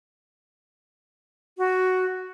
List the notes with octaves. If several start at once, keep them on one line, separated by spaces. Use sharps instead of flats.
F#4